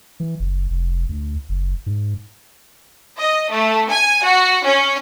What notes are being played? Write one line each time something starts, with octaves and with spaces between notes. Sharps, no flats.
E3
F#1
F1
D2
F#1
G#2
D#5
A3
G#5
F#4
C#4